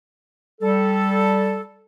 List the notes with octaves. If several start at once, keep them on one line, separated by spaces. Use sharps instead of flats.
G3 A4